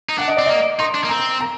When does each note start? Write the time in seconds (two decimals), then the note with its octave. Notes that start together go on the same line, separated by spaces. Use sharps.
0.09 D#4
0.18 D4 F#5
0.28 D#5
0.37 C4 D5
0.46 A#3 D#5
0.79 D#4 C6
0.94 D4
1.04 A#3
1.09 C4 A#5
1.41 A#5